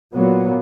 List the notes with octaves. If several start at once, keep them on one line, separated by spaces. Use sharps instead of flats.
A#2 F#3 B3